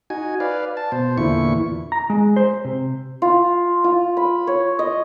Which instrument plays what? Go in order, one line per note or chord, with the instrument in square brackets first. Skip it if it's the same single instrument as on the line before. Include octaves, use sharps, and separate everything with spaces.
[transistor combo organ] D#4 F#4 G#5
B4 D5 F5
A5
B2 C5
E2 A#2 D3 E4 C#6
[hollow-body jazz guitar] A#5
G#3
C5
C3
[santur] F4
F4
B5
C#5
D#5